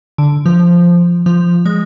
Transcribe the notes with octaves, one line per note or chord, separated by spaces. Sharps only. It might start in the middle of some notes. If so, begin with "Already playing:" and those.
D3
F3
F3
G#3